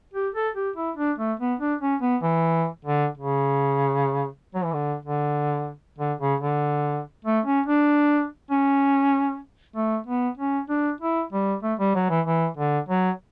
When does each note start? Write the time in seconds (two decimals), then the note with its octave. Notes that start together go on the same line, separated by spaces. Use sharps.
0.14 G4
0.35 A4
0.55 G4
0.76 E4
0.97 D4
1.19 A3
1.40 B3
1.60 D4
1.81 C#4
2.02 B3
2.22 E3
2.85 D3
3.18 C#3
4.55 F#3
4.64 E3
4.73 D3
5.05 D3
5.99 D3
6.20 C#3
6.41 D3
7.25 A3
7.46 C#4
7.67 D4
8.51 C#4
9.76 A3
10.07 B3
10.37 C#4
10.69 D4
11.01 E4
11.33 G3
11.63 A3
11.79 G3
11.95 F#3
12.10 E3
12.26 E3
12.57 D3
12.89 F#3